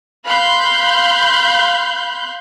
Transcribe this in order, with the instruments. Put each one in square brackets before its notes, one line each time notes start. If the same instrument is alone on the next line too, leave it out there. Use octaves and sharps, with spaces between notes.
[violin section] F5 B5 C6 F#6 G6